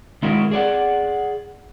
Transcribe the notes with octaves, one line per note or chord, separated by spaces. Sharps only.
D#3 G#3 E4 F#4 A#4 D#5
G#4 D5 F#5